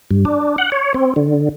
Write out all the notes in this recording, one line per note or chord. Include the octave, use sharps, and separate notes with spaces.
G2
D4
F#5
C#5
C4
D3